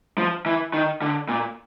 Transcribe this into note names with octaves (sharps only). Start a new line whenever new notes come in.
F3
E3
D#3
D3
A#2